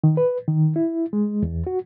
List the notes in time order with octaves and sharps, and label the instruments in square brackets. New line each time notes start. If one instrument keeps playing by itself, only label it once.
[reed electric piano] D#3
B4
D#3
E4
G#3
E2
F#4